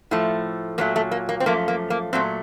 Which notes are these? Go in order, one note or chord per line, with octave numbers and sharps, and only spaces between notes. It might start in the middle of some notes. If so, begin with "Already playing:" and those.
A2 F3 A3
A#2 F#3 A3 A#3
A3
A#3
A#3
C4
F#2 F3 A3 A#3
A#3
A#3
A#2 F#3 A3 C4